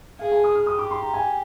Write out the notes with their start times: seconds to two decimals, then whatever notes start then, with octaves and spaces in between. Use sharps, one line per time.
0.19 G#4 F5
0.31 G#5
0.44 D#6
0.55 F6
0.66 G4 D#6
0.79 D6
0.91 C6
1.02 A#5
1.14 G#5